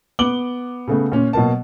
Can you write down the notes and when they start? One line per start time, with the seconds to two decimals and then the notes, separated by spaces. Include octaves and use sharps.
0.19 B3 D6 F#7 G7
0.88 C#3 A3 B3
1.12 A#2 C#4
1.33 B2 F#3 A#3 A5